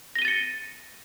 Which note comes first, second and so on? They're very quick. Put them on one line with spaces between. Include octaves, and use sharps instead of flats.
A#6 G7 D#7 A6 C#7